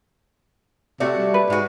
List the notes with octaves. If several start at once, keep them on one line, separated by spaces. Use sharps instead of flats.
C3 A3 D4 F#4 D5
G3 D5
B4
G#2 G#3 F#4